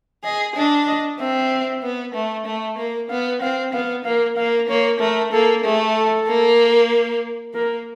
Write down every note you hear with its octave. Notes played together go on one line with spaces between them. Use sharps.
G#4 D#5
D4 D#5
D#5
C4 E5
B3
A3
A3
A#3
B3 F5
C4 F5
B3 F5
A#3 F5
A#3 F5
A#3 C#5
A3 A#4
A#3 A4
A3 G#4
A4
A#3
A#3 A#4